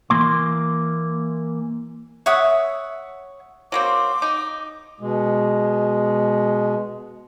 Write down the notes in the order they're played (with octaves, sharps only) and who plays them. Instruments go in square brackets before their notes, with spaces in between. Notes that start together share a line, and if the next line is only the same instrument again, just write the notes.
[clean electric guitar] E3 A#3 C6
[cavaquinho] C#5 E5 F#5 D#6
[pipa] F#3 A#3 C4 [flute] D6
[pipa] D#4
[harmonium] B2 G#3